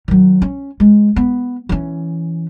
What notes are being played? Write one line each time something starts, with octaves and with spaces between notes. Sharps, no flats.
D#3 F#3
C#4
G#3
B3
E3 C#4